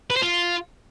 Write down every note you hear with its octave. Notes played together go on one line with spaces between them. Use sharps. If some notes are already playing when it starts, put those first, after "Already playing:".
B4
C5
F4